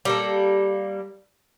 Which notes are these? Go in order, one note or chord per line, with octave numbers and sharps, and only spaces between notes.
G3 A#3 A4